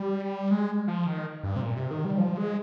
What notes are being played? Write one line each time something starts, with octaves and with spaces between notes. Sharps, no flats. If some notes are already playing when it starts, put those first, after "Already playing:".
Already playing: G3
G#3
F3
D#3
G2
C3
A#2
C3
D#3
G3
F3
G#3